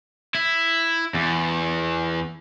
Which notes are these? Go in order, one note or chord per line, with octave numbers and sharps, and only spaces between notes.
E4
E2